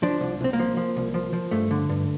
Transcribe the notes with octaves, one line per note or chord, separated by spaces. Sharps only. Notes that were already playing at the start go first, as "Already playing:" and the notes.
F3 D4
C2
C2 C4
A#3
F3
F3
C2
F3
F3
G2 A3
D3
G2